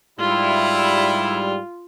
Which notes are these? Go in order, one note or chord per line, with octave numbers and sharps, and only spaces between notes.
G#2 G3 E4 F4